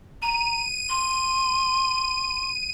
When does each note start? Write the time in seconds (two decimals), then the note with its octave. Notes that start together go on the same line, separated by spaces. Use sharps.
0.22 A#5 D#7
0.89 C6